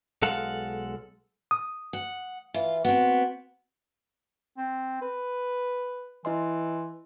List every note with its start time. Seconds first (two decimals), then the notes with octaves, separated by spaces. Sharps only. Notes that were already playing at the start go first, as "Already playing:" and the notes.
0.22 B1 G#3 A4 F5 F#5
1.51 D#6
1.93 F#5
2.54 E3 F4
2.85 B3 C4 F#4
4.57 C4
5.02 B4
6.25 E3 E4 D#5 C6